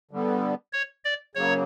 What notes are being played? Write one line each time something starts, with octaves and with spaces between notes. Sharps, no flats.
D3 G3 B3
C#5
D5
C#3 F#3 A#3 C#5